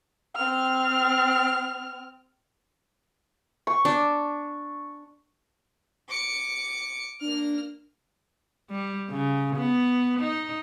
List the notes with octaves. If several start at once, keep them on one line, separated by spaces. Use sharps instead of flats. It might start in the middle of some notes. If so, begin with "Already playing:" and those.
C4 F6
C#6
D4
D6 C#7
A#3 D4 F6
G3
C#3
B3
D#4